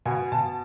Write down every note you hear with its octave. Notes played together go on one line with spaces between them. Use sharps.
B2 G#5
B2 A5